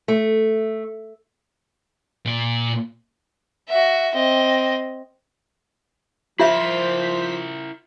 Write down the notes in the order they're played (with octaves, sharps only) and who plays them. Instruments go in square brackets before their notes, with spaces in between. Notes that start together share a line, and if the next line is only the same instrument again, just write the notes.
[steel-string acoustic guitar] A3
[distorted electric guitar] A#2 D5
[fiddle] F#4 E5
C4 D#5
[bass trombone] F3 [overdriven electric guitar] E4 A#4 [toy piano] F4 E5 [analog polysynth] C5 B6